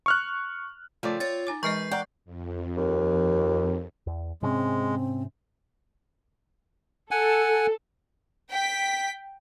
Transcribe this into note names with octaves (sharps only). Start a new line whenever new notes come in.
C#6 F6 F#6
C#3 F3 A3 A#3 C4 D5
F4 C#5 A6
D#4 G#5 D6
E3 G#3 G#4 B4 D#5 C#6 G6 C7
A#4 D5 F#5 G5
F2
D#2
E2
G#2 C3 G#3 C4 C#4
A4 F#5 G#5
G5 B6